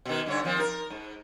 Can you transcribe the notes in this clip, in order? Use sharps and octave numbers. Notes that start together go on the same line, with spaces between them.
B2 D#3
G2 D3 C#5
D#2 F3 C4
A#4
G#2